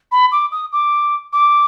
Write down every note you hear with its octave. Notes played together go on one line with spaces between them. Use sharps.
B5
D6
D#6
D6
D6